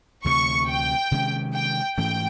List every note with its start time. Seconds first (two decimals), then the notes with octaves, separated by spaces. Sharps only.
0.25 D2 C3 E3 A3 C#6
0.68 G5
1.11 C3 D#3 G#3 C#4
1.54 G5
1.97 G#2 E3 A3 C#4 G5